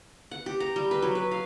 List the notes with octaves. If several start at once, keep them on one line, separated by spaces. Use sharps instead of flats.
F#5
G4
A#5
G3
B4
F#3
B4
F5